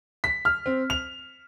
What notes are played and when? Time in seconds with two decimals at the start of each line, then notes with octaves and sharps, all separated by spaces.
0.24 B6
0.45 F6
0.66 C4
0.90 F7